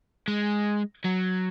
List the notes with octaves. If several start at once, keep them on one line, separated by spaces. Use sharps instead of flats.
G#3
F#3